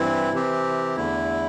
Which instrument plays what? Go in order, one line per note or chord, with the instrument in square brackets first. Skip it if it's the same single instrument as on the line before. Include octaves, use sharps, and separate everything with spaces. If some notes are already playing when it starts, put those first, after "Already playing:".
Already playing: [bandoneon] G2 E3 C4 E4
C3 E3 C4 G4
E2 D3 A3 E4